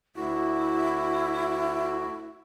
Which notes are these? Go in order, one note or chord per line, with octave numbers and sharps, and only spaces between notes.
D2 D3 E4 F#4